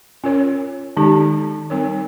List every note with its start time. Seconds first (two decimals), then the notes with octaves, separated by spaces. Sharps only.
0.24 C#4 F4 A#4 C#5
0.97 D#3 G#3 D#4 G4
1.70 G3 C4 D#4 A#4 C#5